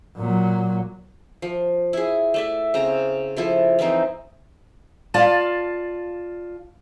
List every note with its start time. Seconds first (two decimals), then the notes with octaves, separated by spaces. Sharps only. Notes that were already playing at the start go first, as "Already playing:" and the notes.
0.17 A#2 F#3
1.42 F3
1.93 E4 G#4
2.34 A3 D5 E5
2.74 C#3 C4 A#5
3.37 F3 E4 A4
3.79 E3 F3 C4 D#4
5.14 F4 D5 F5 A5